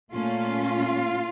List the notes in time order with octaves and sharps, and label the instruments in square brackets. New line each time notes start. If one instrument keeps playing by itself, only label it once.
[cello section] A#2 A3 C#4 F4